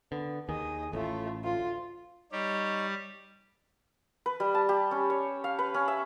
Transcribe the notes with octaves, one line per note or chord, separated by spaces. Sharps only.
D3 B3
D#2 D#3 G#4 D#5
A1 A2 A3 F4
D2 F4
G3 D#4 G4 C#5
B4
G3
A5
G4
C#4
C#5
F5
B4
C#4
E5